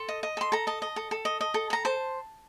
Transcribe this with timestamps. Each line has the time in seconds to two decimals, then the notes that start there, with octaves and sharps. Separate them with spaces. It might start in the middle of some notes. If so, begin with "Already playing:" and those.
Already playing: A4 C6
0.08 D#5
0.23 D#5
0.37 A4 C6
0.52 A4 A#5
0.67 D#5 A5
0.82 D#5
0.96 A4
1.11 A4
1.25 D#5
1.41 D#5
1.54 A4
1.70 A4 A#5
1.85 C5 A5